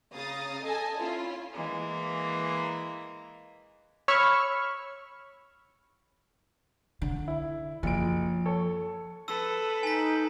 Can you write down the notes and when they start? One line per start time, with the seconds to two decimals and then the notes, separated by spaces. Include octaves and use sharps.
0.13 C#3 F5 A#5 D#6 A6
0.63 A4 D#5 G#5 A5
0.99 C#4 E4 F4
1.55 E3 G#3 A#3
4.08 C#5 B5 C#6 E6 F6
7.02 D3
7.28 E4
7.83 F#1 F3 D7
8.46 A4 C#5
9.28 A4 B4 E6
9.83 D#4 G#5 B6